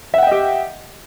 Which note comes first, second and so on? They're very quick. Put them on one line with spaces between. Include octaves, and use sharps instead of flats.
E5 F#5 G5 D#5 G4